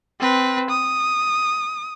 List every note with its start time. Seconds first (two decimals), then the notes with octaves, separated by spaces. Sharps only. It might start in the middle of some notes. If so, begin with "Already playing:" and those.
0.20 C4 B4
0.70 D#6